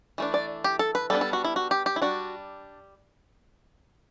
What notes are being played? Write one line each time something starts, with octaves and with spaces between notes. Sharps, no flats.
E3 A3 D4
D5
G4
A4
B4
G3 B3 D4 A4
A4
F#4
E4
F#4
G4
G4
E4
G3 D4 F#4